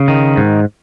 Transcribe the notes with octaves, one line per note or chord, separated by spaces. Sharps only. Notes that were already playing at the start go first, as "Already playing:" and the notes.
Already playing: C#3
D#3
G#2